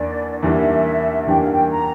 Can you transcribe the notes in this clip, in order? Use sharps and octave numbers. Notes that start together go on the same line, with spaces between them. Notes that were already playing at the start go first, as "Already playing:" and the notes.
Already playing: E2 E3 A#3 D4 D5
E2 E3 G3 A#3 D4 E5
E2 E3 G3 A#3 D4 G5
F5
G5
A#5